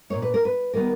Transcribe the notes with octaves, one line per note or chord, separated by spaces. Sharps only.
A#2 A#3 C#5
B4
A#4
B4
D#3 G3 B3 A#4